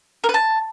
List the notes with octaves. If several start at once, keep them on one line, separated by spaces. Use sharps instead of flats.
A#4
B4
A5